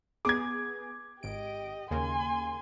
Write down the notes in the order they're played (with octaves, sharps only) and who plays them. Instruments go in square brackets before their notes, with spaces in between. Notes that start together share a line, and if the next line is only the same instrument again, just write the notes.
[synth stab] B3 G#4 [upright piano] D6 G#6
[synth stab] G#1 D7 [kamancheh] G4 D#5
[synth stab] D#2 C#3 A#3 [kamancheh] G#5 C6